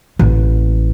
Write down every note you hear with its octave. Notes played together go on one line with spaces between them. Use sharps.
A1 A#3